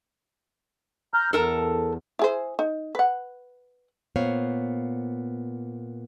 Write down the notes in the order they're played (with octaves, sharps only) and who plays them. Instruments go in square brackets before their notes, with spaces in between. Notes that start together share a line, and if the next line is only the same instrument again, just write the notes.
[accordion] A#5 F6 G6
[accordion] E2 [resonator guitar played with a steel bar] A4 A#4 A5
[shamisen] E4 G#4 C5
D#4
B4 F#5
[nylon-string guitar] A#2 B3 C5 C#5 F5